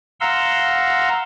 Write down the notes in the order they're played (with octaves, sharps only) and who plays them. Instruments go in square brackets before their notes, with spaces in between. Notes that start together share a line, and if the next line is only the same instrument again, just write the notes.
[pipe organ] F5 F#5 A#5 C6 E6